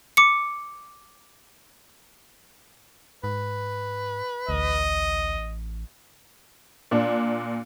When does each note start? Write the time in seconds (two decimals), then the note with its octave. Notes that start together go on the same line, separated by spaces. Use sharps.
0.17 D6 C#7
3.24 G#2 B4
4.49 A1 D2 D#5
6.91 A#2 D4